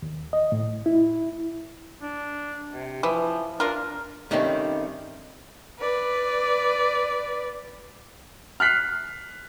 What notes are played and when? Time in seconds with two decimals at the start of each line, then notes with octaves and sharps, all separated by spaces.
0.02 D#2
0.33 D#5
0.52 A2
0.86 E4
2.02 D4
2.73 C3
3.03 E3 F3
3.60 D4 F4 A#4
4.31 G2 D#3 A3 C4 C#4
5.79 B4 D5
8.60 F6 F#6 B6 C7